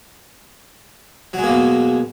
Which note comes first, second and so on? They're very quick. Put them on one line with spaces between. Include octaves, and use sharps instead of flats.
F#3 G#3 A#3 B2